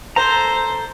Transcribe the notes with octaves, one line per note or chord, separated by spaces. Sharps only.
A4 C5 A#5